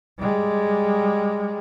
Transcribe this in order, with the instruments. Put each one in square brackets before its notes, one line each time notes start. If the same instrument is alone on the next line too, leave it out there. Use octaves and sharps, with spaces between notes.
[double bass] G3 G#3